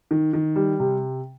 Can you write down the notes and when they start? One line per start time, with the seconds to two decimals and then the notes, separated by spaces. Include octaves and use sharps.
0.11 D#3
0.33 D#3
0.56 G3
0.80 C3